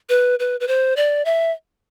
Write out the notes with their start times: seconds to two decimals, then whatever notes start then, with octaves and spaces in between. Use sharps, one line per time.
0.09 B4
0.39 B4
0.60 B4
0.68 C5
0.97 D5
1.25 E5